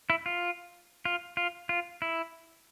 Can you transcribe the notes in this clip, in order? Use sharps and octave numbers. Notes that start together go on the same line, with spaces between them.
E4
F4
F4
F4
F4
E4